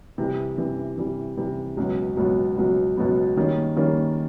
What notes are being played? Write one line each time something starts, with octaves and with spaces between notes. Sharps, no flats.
C3 E3 G3
C3 E3 G3
C3 E3 G3
C3 E3 G3
C#2 B2 F#3 B3
C#2 B2 F#3 B3
C#2 B2 F#3 B3
C#2 B2 F#3 B3
D#3 G3 A#3 C#4
D#3 G3 A#3 C#4